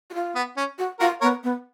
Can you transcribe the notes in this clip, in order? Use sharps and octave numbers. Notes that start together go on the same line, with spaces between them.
F#4
F4
B3
C#4
F#4
F4 F#4 A#4
B3 A#4 C#5
B3